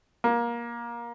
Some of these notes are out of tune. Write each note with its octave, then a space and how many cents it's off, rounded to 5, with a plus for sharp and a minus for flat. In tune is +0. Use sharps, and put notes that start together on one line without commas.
A#3 +20